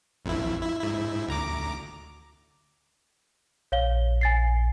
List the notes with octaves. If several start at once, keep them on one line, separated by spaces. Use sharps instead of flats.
A1 F2 E4
E4
G#2 E4
D2 A#5 D6
A#1 C#5 F5 G7
G#5 A6 C7